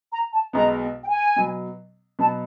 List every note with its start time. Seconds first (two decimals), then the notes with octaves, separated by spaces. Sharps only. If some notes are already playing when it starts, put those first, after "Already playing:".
0.12 A#5
0.33 A5
0.53 B1 B2 G#3 B3 A#5
1.04 G5
1.08 G#5
1.36 B2 F#3 B3
2.19 B2 F#3 B3 A5